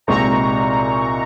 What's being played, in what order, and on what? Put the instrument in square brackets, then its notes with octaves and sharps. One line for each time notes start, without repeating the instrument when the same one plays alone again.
[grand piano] C2 A#2 G#3 C4 D#4 [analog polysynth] A#5 C#6